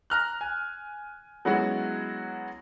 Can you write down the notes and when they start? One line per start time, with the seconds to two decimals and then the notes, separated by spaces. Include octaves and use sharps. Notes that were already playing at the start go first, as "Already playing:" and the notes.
0.10 A#5 F6 F#6
0.41 G#5
1.45 F#3 G#3 B3 C#4 E4 F#4